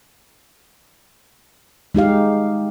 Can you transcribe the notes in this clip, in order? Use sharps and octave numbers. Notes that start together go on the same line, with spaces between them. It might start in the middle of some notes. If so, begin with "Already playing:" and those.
G#3 D#4 G4 F5